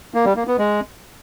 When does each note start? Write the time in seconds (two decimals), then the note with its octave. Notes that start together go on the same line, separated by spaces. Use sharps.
0.14 A#3
0.25 G3
0.36 A#3
0.47 B3
0.58 G#3